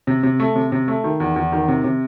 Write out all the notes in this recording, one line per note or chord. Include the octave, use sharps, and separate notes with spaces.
C3
C3
A3
C3
C3
A3
D#3
E2
E2
D#3
C3
C3